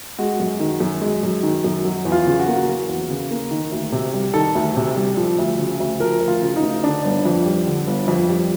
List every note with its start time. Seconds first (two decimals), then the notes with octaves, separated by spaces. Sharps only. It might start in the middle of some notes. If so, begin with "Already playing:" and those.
0.19 G#3 F#4
0.40 F#2
0.60 D#3
0.80 F#2
1.01 G#3
1.23 F#2
1.43 D#3
1.64 F#2
1.85 F#3
2.05 E2
2.12 F4
2.27 C#3
2.40 F#4
2.48 A#3
2.67 F#3
2.89 E2
3.10 C#3
3.31 A#3
3.51 D#3
3.72 D2
3.92 C3
4.14 G3
4.34 D#3 A4
4.55 D2
4.76 C3
4.96 G3
5.17 F3
5.39 D2
5.59 C#3
5.80 D2
6.00 F3 A#4
6.21 D2
6.28 F4
6.42 C#3
6.56 D#4
6.62 D2
6.83 D3 D4
7.05 G1
7.25 F2
7.46 G3
7.66 D3
7.87 G1
8.08 F2
8.29 G3